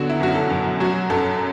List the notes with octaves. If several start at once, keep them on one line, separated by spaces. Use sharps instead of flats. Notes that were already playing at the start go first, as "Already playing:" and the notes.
Already playing: B2 D3 F#3 F#4
E4
F#2 F#4
A4
F#2
F#3 F#4
F#2 A4